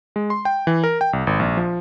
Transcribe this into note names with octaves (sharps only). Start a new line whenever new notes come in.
G#3
C6
G5
E3
A#4
G5
C2
G#1
A#1
F3